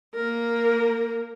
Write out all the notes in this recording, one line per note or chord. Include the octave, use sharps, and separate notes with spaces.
A#3 A#4